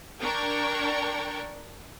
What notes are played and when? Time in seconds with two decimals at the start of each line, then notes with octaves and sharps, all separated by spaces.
0.21 D4 A#4 G5 C#6 G#6